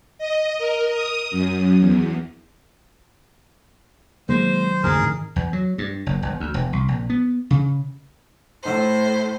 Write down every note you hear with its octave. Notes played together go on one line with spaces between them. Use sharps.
D#5
A#4
D#6
F#2
E2
D#3 F#3 G#3 A#3 C5
A1 F2 D3 E3 A3 G#4 A#4
G#2 D#3
E2
F#3
G2
F#1
G1
D2
E1
C2
A#1
B3
C#3
A2 C5